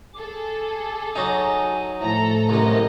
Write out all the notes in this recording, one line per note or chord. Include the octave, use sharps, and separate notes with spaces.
G#4 A4 D6
F#3 D#4 G#5
A2 F3 A3 A4 A#5
C2 F#2 D#5